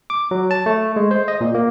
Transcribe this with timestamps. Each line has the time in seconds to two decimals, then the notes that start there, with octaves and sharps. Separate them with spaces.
0.10 D6
0.31 F#3
0.51 A5
0.66 A3
0.96 G#3
1.11 C5
1.28 D#5
1.41 A#2
1.54 A#3